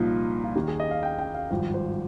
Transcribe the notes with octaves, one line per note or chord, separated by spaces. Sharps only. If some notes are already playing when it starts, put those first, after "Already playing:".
Already playing: C2 A#2 F3 D#4
F4
D#2 D#3 G4
G#4
D#5
F5
G5
G5
F5
G#1 G2 F3 G5
C5